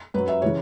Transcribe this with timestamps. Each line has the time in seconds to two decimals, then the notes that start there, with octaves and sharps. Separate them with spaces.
0.14 F#2 F#3 B4
0.28 E5
0.42 C#3 E3 C#5